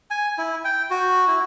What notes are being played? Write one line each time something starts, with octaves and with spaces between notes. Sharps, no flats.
G#5
E4
G5
F#4
E4